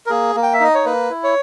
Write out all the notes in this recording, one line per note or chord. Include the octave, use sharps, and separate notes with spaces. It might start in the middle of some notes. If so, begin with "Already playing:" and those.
A#4
A#3 G#4
A#3
G5
E5
D#4 D#5
C#5
A#3 B4
E4
C#5